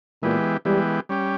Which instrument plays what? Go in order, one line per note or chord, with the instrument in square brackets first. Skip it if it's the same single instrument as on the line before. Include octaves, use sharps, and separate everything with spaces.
[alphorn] A#2 [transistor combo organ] E3 G#3 B3 G4
[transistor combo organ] E3 G#3 B3 G4 [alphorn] G3
[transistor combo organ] G3 C#4 G4